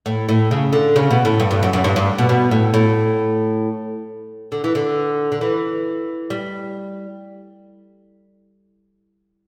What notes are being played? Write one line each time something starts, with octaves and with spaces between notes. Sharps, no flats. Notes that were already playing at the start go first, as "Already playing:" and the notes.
A2
A2
C#3
D3
C#3
B2
A2
G2
G2
F#2
F#2
G2
G2
B2
B2
A2
A2
D3
E3
D3
D3
E3
G3